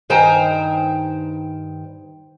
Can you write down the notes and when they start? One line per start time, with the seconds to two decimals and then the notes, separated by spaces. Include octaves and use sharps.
0.10 G2 D#3 C5 G5 G#5 A#5